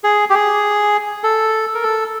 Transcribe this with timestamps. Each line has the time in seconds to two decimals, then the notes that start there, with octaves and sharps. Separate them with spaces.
0.04 G#4
0.30 G4
0.34 G#4
1.24 A4
1.75 A#4
1.83 A4